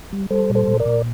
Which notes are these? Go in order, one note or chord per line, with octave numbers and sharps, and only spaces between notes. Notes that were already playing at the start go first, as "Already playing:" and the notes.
G3
G3 A4 C5
A#2
A4 C5
A#2
A#4 D5
A#2